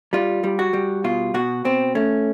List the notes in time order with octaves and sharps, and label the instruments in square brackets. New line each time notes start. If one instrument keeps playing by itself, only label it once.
[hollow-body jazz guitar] G3 F4
G3
F#4
G3
B2 F4
B2 F#4
B2 C4
A3 C#4